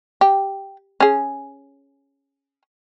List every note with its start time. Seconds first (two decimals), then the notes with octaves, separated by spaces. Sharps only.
0.21 G4
1.00 C#4 G#4